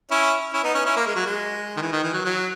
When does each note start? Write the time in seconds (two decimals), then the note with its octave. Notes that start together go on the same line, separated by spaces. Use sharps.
0.11 C#4 E4
0.53 C#4 E4
0.63 B3 D#4
0.75 C#4
0.85 C#4 E4
0.97 A#3
1.07 G#3
1.16 F#3
1.26 G#3
1.77 D#3
1.81 E3
1.92 D#3
2.03 E3
2.13 F#3
2.25 F#3